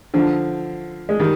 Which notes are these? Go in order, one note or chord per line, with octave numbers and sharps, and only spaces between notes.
D3 F3
G#3
D#3 G3